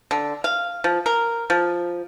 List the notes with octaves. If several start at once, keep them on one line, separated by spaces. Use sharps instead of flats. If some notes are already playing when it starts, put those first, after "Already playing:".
D3
F5
F3
A#4
F3